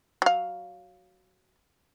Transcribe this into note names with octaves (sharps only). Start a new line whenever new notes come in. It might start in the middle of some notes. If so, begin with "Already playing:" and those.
F#3 F5